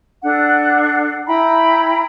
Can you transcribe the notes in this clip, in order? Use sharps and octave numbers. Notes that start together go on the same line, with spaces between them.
D4 A4 F#5
E4 G5 A#5 B5